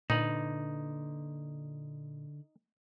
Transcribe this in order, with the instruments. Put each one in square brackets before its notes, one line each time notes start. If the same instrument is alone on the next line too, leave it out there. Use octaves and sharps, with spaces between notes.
[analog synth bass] A#2 [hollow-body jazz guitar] D3 B4 [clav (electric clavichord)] D#4